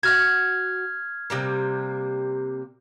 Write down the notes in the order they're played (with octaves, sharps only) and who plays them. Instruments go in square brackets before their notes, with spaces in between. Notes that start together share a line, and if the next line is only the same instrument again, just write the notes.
[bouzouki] F#4 F#5 [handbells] F6 G#6
[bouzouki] C3 G3 A#3